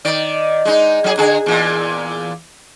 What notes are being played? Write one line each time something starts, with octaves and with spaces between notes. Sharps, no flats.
D#3 D5
G#3 D#4
F#3 G#4
D3 G#4
E2 A#2